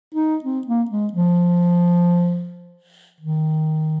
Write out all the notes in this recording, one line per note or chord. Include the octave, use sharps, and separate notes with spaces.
D#4
C4
A#3
G#3
F3
D#3